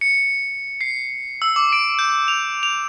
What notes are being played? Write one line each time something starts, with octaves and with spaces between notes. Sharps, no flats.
C#7
C7
E6
D6
D7
G6
F7
F7